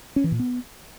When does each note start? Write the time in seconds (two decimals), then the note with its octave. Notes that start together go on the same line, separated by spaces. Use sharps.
0.16 C#4
0.24 E3
0.32 A#2
0.39 B3